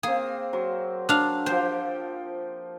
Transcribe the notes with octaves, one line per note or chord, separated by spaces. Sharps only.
A#3 C4 G#4
F#3 C5
D4 F5
F3 G4 C5 G5